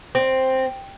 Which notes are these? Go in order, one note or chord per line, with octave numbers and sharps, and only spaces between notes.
C4